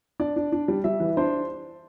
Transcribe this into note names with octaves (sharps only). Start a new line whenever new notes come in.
D4 D5
D4
D4
G3
G3 E5
E3
D4 C5